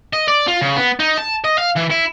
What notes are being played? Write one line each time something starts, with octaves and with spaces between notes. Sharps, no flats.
D#5
D5
F4
C#3
B3
D#4
A5
D#5
F5
E3
E4